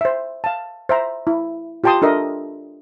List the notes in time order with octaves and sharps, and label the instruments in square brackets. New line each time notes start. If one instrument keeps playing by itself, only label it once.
[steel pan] C5 E5
F5 A5
C5 E5 A#5
E4
F4 G4 G5 A5 C6 D#6
D4 A4 A#4 D#5 E5